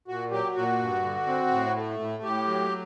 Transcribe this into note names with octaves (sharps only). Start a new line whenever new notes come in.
A#2 F#4
F#3 G4
A#2 F#4
G2
D3
C4
A2
A3
A2
A2 G4
F#3